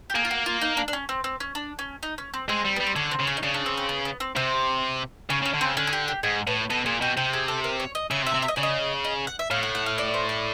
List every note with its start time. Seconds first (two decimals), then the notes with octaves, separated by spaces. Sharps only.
0.10 G4
0.15 A#3 G#4
0.25 F4
0.31 F#4
0.46 F4
0.61 D#4
0.77 D4
0.88 D4
0.93 C#4
1.09 C4
1.24 C4
1.40 C#4
1.55 D4
1.79 C#4
2.03 D#4
2.18 C#4
2.34 C4
2.49 G#3 C4
2.65 G3
2.76 G3 B3
2.87 C4
2.96 D3 C#4
3.11 C4
3.19 C#3
3.27 C#4
3.37 D#4
3.43 C#3 D4
3.54 D4
3.66 C4
3.77 C4
3.89 B3
4.05 B3
4.20 C4
4.36 C3 C4
5.30 C#3 C#4
5.42 C#3
5.45 C#4
5.54 D3
5.61 C#3 C4
5.77 D3 C#4
5.87 G#4
5.93 G4
6.08 G4
6.23 G#2 G#4
6.47 A2 B4
6.70 B2 A4
6.86 A#2 G#4
7.01 B2 G4
7.17 C3 G4
7.33 G#4
7.48 A4
7.64 A#4
7.80 C#5
7.95 D#5
8.11 C#3 E5
8.23 C3
8.26 E5
8.34 C3
8.42 E5
8.48 D#5
8.56 C#3 D5
8.63 D#5
9.04 D#5
9.27 F#5
9.39 E5
9.51 A2 F5
9.63 F#5
9.75 F#5
9.86 F5
9.98 D5
10.14 C5
10.29 D5